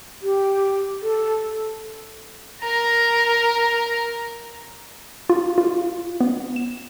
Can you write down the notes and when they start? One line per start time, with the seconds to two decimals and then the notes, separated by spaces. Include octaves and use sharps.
0.22 G4
1.03 A4
2.62 A#4 A#5
5.30 F4
5.58 F4
6.21 B3
6.56 E7